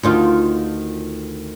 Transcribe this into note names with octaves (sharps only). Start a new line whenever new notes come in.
D2 D#3 F4